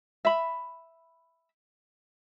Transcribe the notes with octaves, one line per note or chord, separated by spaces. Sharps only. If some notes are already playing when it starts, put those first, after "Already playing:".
E5 B5